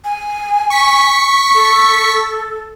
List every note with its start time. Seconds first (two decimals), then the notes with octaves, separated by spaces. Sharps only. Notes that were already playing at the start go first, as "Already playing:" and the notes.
0.04 G#5
0.70 C#6 B6
1.55 A4